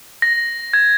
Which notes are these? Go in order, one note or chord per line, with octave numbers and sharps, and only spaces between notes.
A#6
G#6